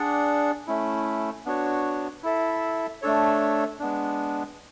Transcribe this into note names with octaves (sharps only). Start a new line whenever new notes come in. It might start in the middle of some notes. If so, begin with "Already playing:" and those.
Already playing: D4 G#4 D5 F#5
A3 C#4 E4
B3 D4 F#4 C#5
E4 A4 E5
A3 D4 A4 C#5
G#3 B3 D4